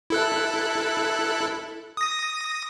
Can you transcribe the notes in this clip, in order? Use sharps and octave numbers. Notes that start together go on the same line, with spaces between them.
E4 A4 F#6
D#6 A#6